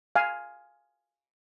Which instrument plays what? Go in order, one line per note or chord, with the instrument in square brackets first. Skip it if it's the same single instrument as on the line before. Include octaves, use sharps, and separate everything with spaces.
[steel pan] F5 G#5